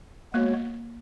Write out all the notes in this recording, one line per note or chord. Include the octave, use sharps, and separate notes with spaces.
G#3 A#3 B3 F#4 C#5